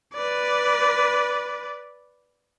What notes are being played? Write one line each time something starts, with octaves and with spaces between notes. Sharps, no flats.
B4 D5